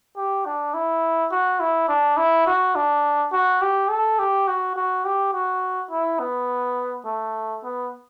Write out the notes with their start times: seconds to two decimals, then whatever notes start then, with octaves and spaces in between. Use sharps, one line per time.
0.16 G4
0.45 D4
0.74 E4
1.31 F#4
1.60 E4
1.88 D4
2.17 E4
2.47 F#4
2.75 D4
3.32 F#4
3.61 G4
3.90 A4
4.19 G4
4.48 F#4
4.76 F#4
5.05 G4
5.33 F#4
5.90 E4
6.19 B3
7.05 A3
7.64 B3